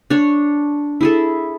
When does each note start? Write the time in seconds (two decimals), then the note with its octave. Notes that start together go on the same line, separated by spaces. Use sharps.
0.10 D4 C#5
1.01 E4 G#4 A4